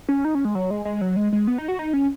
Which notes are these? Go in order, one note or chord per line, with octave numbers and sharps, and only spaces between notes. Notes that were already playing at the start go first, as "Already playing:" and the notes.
C#4
D#4
C#4
G#3
F#3
G#3
G#3
F#3
G#3
G#3
B3
D#4
F#4
D#4
C#4